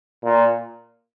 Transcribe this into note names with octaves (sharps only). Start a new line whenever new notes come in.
A#2